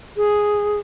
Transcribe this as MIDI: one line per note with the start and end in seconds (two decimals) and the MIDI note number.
0.17 0.80 68